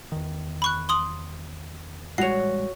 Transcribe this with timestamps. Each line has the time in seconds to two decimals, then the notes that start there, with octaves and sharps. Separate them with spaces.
0.12 E2 D#3
0.62 B5 C#6 F#6
0.89 C6 D#6 F#7
2.18 A1 G3 G#3 F#4 C#5 C7 F7